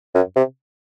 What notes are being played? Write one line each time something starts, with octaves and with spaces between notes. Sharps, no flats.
F#2
C3